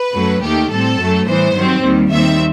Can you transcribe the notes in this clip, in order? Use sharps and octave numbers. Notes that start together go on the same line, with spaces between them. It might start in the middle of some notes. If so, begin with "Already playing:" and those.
Already playing: B4
F#2 F#3 A3
D#2 D#3 A3 G4
A2 G3 C4 A4
F#2 F#3 A3
A2 E3 G3 B3 C5
G2 D#3 F#3 C4
D#2 D#3 G3
D#2 D#3 G3 C4 E5